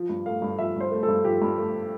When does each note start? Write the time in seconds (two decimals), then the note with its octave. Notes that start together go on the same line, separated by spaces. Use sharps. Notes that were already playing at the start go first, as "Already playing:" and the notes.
Already playing: F3
0.10 G2
0.26 A3 F5
0.42 G2
0.59 F3 E5
0.76 G2 C5
0.92 A3
1.03 A4
1.08 G2
1.25 F3 G4
1.42 G2
1.58 A3